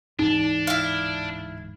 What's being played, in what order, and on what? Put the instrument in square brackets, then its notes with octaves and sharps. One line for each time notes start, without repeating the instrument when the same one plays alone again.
[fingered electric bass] D1 G#2 E3 [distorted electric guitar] D4 [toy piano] D#4
[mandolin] E4 F5